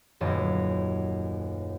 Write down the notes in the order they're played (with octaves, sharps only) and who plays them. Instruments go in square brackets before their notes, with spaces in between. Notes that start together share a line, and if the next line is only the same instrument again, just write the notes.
[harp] D#1 F#2 A3